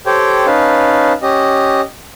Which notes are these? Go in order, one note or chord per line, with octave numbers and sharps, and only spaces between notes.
G4 A4 C5 C#5 G5
C#4 D#4 B4 F5 A5
C#4 G4 D#5